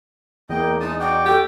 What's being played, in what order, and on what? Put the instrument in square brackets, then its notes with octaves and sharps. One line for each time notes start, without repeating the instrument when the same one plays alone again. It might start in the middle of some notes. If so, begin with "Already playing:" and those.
[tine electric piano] E2 [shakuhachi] A#3 [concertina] D#5 G5
[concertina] G#3 A5 D#6 [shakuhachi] D#4
[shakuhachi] D#4 [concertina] F#4 D5 G5
[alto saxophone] G4 [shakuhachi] A4